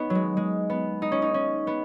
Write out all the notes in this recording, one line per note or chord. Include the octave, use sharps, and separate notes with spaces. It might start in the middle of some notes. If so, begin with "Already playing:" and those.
Already playing: B3 C#4 D#4
F#3
G#3
G#3
B3
D#4
C#4
D#4
C#4
B3